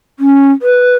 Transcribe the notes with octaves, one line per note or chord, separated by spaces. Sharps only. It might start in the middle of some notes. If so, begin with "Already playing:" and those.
C#4
B4